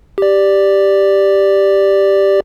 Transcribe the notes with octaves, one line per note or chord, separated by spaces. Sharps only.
G4 D5